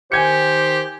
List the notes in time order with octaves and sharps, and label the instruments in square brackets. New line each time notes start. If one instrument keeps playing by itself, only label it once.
[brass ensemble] D#3 C5 [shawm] G4 [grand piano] G#5 G#6 C#7